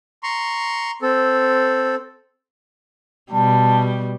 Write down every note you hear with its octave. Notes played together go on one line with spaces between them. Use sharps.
A#5 C6 C#6
C4 A4
B2 G3 A5